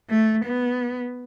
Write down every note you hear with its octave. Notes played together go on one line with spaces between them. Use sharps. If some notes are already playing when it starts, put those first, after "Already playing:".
A3
B3